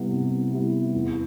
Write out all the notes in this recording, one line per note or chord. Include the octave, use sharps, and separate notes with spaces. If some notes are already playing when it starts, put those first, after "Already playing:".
Already playing: C3 G3 B3 E4
C3
G3 B3 E4
E2